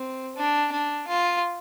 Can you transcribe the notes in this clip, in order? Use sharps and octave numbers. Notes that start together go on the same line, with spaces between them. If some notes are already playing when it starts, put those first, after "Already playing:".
Already playing: C4
D4
D4
F4